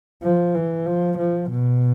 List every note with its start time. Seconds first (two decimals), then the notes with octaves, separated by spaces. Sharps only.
0.23 F3
0.55 E3
0.86 F3
1.18 F3
1.50 B2